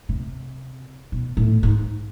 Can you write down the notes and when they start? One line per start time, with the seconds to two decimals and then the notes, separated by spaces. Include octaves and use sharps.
0.09 C3
1.12 B2
1.37 A2
1.63 G#2